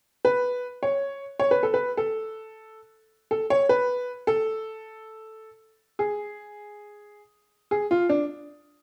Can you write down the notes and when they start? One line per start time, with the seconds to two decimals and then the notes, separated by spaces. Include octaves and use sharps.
0.25 B4
0.83 C#5
1.39 C#5
1.51 B4
1.63 A4
1.74 B4
1.97 A4
3.31 A4
3.50 C#5
3.69 B4
4.27 A4
5.99 G#4
7.71 G#4
7.91 F4
8.09 D4